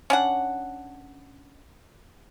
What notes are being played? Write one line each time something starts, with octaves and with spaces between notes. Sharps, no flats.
C#4 D4 F#5